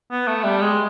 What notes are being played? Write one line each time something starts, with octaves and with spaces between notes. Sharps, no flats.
B3
A3
G3
G#3